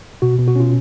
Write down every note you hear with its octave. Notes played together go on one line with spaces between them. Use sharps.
B2 F#4
B2
F#4
C#4 F4